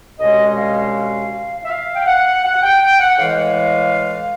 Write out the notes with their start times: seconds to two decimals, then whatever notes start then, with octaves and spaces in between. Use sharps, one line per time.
0.19 C2 B2 G#3 C#4 D#5
0.56 F5
1.65 E5
1.69 F5
1.95 G5
2.07 F#5
2.44 F#5
2.54 F#5
2.63 G5
2.81 G5
2.99 F#5
3.18 A2 E3 G#3 F5